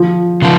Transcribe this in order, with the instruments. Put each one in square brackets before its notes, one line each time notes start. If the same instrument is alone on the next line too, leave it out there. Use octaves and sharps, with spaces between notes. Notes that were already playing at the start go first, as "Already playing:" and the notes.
Already playing: [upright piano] F3
[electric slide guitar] C#3 F3